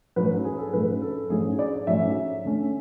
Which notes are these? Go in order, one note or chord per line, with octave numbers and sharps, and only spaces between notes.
G#2 F#3 A3 C#4 B4
G#4
A4
G#2 F#3 A3 C#4 B4
A4
G#2 F#3 A3 C#4 G#4
D5
G#2 F#3 A3 C#4 E5
D3 A3 C#4